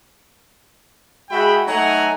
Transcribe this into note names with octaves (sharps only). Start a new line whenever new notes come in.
G#3 F#4 G#4 E5 G5 B5
F#3 A3 D#4 F#5 G#5 A#5